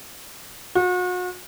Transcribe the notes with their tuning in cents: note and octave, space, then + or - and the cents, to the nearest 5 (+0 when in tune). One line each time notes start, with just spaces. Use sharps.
F#4 -40